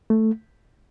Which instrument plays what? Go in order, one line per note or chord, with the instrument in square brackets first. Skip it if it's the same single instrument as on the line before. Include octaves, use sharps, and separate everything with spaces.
[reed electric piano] A3